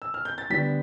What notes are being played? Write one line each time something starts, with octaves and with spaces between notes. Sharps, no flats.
E6
F6
G6
A6
D2 D3 G3 B3 D4 B6